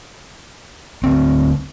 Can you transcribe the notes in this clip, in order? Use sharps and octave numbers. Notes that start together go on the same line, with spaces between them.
D2 C4